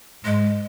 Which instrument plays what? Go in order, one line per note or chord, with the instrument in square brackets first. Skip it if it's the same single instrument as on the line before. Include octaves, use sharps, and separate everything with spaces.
[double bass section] G#2 [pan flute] G#3